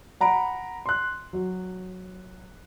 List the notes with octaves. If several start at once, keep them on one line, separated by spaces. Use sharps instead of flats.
F#5 A#5 B5 D7
C6 F#6
F#3